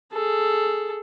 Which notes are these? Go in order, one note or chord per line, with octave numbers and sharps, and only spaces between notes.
G#4 A4